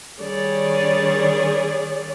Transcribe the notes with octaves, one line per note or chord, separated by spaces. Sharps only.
D#3 G3 D4 G#4 C#5 D5